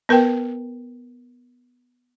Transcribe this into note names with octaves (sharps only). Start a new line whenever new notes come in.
B3 A#4 B4 G5